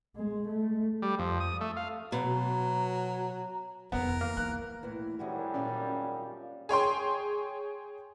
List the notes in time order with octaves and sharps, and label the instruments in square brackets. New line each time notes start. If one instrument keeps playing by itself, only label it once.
[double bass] G#3
A3
[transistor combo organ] G3
F2
D#6
A3
F5
[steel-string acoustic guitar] B2 [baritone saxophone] F#3 [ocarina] A#5
[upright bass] F2 C#3 [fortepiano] B3 [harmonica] A#4
[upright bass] E3
[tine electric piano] A#3 [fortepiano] F6
[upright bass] E3 [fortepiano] F#6
[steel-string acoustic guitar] E2 A2 E3
[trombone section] G#1 F#2 G3 [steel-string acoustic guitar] E3 G#3 F#4
[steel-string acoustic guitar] A#2 F4 D5 [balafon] C#4
[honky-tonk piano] G#4 C#5 G5 C6